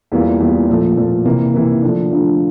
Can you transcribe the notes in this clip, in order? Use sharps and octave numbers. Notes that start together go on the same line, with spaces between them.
E2 E3 G3 A#3 F4
E2 E3 G3 A#3 F4
A#2 F3 A3
A#2 F3 A3
C3 E3 A#3
C3 E3 A#3
D3 F3 A3 D4
D3 F3 A3 D4